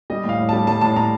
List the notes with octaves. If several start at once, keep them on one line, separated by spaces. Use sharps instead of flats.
G3 D#5
A2 F5
A2
G3 A5
G3 A5
A2 A5
A2 A#5